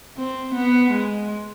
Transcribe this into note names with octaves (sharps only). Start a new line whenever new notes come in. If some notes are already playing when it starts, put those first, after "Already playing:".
C4
B3
G#3